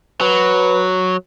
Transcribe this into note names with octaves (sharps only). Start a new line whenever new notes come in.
F#3 B4